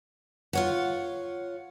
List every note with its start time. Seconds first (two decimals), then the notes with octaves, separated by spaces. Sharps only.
0.53 F4 C#5 F#5